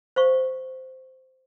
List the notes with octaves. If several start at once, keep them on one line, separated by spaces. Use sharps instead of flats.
C5 F5 C#6